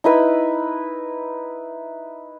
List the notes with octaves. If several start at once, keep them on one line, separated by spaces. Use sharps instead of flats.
D#4 E4 B4 E6